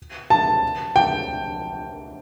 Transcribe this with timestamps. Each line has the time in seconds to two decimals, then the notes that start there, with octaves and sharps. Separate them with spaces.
0.30 A5
0.96 G5